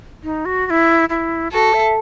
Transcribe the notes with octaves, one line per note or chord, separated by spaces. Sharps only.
D#4
F#4
F#4
E4
E4
F#4 A4
E5